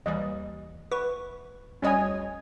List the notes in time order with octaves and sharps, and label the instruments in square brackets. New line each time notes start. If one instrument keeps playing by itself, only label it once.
[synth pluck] D#2 E3 G3 [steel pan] D#5
[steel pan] B4 [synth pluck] C#6
[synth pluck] D2 G3 C#5 [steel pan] C#4 D#5 G#5